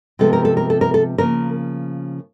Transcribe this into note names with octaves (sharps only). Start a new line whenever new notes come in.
C3 F3 G#3 B3 A4
A#4
A4
A#4
A4
A#4
A4
C#3 F3 A#3 A#4